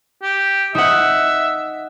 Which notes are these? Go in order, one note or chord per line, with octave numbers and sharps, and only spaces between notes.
G4
D#4 E5 F#5